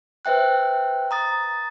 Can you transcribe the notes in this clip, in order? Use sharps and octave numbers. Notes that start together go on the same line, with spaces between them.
B4 C5 E5 G5 F#6
A#5 D#6 A6